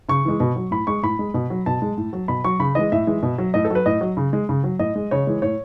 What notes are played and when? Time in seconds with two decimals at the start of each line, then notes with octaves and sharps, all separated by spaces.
0.09 C#3 C#6
0.25 E3 G#3
0.40 B2
0.56 F#3
0.71 A2 B5
0.87 G#3 C#6
1.03 A2 B5
1.19 G#3
1.34 B2
1.50 F#3
1.66 B2 A5
1.82 G#3
1.98 A2
2.13 F#3
2.28 B2 B5
2.44 F#3 C#6
2.59 C#3 B5
2.75 E3 G#3 D#5
2.92 A2 E5
3.07 E3 G#3
3.23 B2
3.38 F#3
3.54 A2 D#5
3.65 A4
3.70 F#3 B4
3.86 A2 D#5
4.01 F#3
4.17 C#3
4.33 G#3
4.49 C#3
4.64 F#3
4.79 A2 D#5
4.96 G#3
5.11 C#3 C#5
5.27 E3 G#3
5.42 A2 C#5